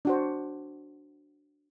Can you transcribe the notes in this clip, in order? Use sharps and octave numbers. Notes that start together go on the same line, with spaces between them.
D4 F#4 C5